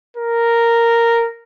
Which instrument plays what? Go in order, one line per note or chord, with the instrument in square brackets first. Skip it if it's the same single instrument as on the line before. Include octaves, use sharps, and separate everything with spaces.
[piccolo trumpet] A#4